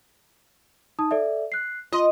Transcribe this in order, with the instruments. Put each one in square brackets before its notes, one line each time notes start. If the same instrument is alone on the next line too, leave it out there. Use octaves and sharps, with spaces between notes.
[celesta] D#4 A5 D#6
A4 D5 E5
F#6 C7
[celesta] F4 C6 [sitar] D#5